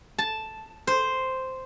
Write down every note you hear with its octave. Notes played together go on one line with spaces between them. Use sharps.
A5
C5